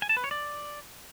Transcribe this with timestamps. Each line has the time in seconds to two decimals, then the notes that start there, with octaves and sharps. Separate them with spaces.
0.02 G#5
0.09 A5
0.17 B4
0.24 C#5
0.31 D5